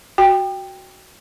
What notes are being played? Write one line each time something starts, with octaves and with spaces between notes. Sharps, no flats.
F#4 G5